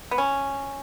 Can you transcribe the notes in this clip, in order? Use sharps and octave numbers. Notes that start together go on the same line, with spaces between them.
B3
C#4